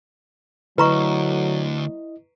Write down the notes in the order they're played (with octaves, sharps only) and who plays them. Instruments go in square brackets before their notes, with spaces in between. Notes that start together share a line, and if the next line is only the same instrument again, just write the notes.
[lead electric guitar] D2 [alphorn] F#3 [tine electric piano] E4 D#5 [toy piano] B4 A#5 C#6